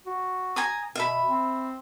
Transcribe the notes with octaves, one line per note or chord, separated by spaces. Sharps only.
F#4
G#5 A#5 D#6
B2 E5 B5
C4